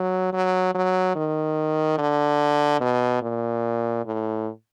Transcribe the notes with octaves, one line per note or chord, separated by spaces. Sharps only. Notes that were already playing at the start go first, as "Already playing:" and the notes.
Already playing: F#3
F#3
F#3
D#3
D3
B2
A#2
A2